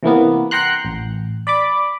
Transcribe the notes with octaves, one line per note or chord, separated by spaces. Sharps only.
C3 E3 A#3 B3
F#5 G5 A#5 C6 F#6
A1
D5 B5 D6